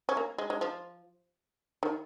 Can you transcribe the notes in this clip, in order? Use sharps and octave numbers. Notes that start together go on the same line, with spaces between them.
C#4
A#3
G#3
G#3
F3
D#3